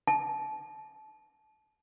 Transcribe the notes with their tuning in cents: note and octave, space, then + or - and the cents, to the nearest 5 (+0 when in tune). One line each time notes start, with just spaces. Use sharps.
A5 -30